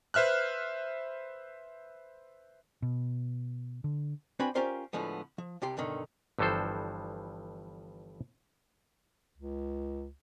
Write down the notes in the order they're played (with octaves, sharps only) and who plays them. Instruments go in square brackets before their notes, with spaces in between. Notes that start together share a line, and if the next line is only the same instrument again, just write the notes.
[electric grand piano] B4 C5 E5 F6 F#6
[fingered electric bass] B2
D3
[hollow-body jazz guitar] C4 D4 F#4 B4 G#5 B5
C#4 F4 G4 A#4 C5 D5
A2 D3 F3 G#3 B3
F3
C2 C3 G4 C6
G2 B2 D3 D#3
[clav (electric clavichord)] G1 G2 E3 F3 A4 C5
[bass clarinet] C#2